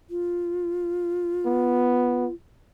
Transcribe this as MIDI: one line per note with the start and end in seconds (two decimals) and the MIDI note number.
0.10 2.34 65
1.46 2.26 59